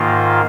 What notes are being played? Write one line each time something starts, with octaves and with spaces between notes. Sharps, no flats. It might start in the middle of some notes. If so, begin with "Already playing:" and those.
Already playing: G#2 D#3 A#3 F4